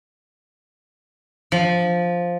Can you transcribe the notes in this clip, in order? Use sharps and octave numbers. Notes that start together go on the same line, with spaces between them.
F3